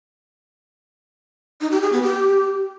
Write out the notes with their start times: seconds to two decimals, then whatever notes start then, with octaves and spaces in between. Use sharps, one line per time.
1.61 D#4
1.71 G4
1.82 G#4
1.92 B3
2.03 G4